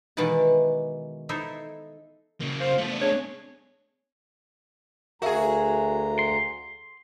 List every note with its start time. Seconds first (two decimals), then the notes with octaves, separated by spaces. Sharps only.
0.17 B2 D#3 E3 G#3 B4 A5
1.29 D#4 E4 A4 C5 E5
2.41 C#3 A#3
2.60 C5 F5
2.78 F3 A3 B3
2.90 D4
3.01 D4 G#4 C#5
5.22 D2 F#4 G#4 A#4 E5 F5 A#5
6.19 C6